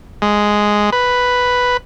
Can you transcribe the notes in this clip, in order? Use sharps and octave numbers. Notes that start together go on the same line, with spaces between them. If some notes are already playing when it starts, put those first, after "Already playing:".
G#3
B4